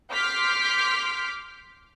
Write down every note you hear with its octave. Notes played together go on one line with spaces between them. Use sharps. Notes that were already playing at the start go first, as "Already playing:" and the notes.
C6 D6 F6 G6 B6